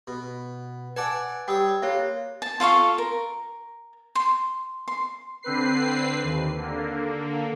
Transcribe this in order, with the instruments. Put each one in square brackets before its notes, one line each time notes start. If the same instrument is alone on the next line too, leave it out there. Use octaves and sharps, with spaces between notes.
[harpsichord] B2
[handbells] B4 A5 [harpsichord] D5 F#5 G#5
[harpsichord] G3 C#5 [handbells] G5 D#6 E6
[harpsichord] A#3 [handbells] G4 C#5 F5
[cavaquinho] A5
F4 A4 F5 C#6
A#4
C6
C6
[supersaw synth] D3 C4 B4 C7
D#2
D3 A#3